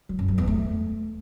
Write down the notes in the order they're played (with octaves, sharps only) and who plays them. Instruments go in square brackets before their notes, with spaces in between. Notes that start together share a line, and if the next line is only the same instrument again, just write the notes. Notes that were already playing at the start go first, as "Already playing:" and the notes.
[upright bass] F#3
F#2
F#3
E2
A3